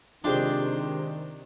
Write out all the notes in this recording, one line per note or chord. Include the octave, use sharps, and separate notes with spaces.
C3 D#3 G#3 D4 F4 G4 C5